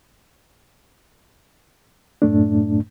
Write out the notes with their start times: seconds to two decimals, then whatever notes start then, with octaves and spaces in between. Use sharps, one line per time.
2.22 F#2 A2 A3 D4